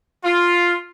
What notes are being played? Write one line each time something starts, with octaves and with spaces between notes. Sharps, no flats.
F4